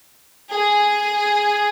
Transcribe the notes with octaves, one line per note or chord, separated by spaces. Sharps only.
G#4